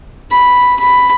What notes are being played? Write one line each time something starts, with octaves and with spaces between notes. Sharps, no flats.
B5
B5